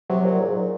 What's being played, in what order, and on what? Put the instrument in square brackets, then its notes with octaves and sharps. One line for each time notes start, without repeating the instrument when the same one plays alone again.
[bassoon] C3 [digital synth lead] F#3
[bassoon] A#2
G#2
A#2